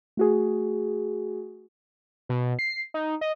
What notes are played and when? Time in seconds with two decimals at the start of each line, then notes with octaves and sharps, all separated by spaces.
0.17 A3 F#4 G#4
2.29 B2
2.59 C7
2.94 D#4
3.21 D#5